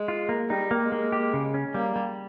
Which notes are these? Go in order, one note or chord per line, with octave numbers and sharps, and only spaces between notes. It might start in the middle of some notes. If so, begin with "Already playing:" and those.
Already playing: G#3
F4
A#3
G3 D#4
A#3
G#3
A#3
G4
C#3
C#4
G3 A#3
G3